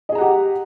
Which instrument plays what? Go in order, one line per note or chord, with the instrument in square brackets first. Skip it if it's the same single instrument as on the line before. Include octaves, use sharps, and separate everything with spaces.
[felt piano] D#5
G#4
A#5
F#5
G4